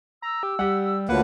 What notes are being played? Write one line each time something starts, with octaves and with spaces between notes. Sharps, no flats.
A#5 E6
G4
G3 G4 F#5
D2 A#3 F4 B4 C#5 F#5